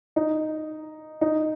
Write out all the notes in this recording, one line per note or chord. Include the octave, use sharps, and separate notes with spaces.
D#4
D#4